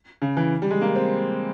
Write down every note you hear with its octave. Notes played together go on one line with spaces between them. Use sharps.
C#3
E3
G3
G#3
A#3
C4